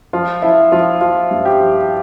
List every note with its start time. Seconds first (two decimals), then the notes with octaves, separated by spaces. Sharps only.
0.13 F3 F4
0.42 F3 E4
0.72 F3 F4
1.01 F3 F4
1.31 G2
1.45 G4
1.59 F3